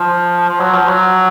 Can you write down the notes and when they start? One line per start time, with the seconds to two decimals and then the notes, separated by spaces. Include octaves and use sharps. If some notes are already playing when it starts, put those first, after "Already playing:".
Already playing: F3
0.48 F3
0.59 F#3
0.74 F3
0.88 F#3